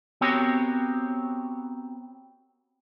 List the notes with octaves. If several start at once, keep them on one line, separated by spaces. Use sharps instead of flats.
B3 C4 F#4 G4 A#4 C#5